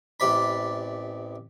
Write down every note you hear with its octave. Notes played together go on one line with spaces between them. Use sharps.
A1 C3 D5 B5